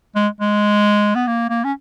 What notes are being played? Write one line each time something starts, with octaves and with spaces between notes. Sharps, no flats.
G#3
G#3
B3
A#3
A#3
C#4